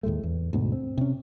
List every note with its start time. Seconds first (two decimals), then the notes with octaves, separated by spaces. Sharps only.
0.03 D#2 A2 G#3 A3
0.23 E2
0.53 D2 G#2 B2
0.72 C4
0.98 C3 C#4